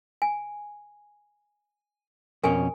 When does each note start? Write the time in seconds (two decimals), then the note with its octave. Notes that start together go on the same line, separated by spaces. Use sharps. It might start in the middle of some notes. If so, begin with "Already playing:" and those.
0.22 G#5
2.43 F2 B2 C#4 A#4 G#5